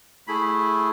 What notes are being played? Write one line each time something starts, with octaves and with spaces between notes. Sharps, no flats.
A3 E4 G#4 B5